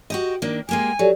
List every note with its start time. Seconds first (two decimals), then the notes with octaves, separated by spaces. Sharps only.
0.10 F#4 G4 D#5
0.42 D#3 A#3 D4
0.69 G#3 A#3 G4 G#5
0.99 F#3 G4 A4 D5